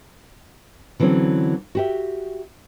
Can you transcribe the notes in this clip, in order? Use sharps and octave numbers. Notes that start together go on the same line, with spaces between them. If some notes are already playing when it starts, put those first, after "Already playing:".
D3 E3 F#3 C4 C#4
F#4 G4 E5